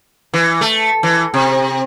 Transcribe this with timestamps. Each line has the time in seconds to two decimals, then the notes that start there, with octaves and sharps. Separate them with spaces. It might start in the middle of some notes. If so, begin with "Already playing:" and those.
0.34 E3
0.61 A3
1.03 E3
1.34 C3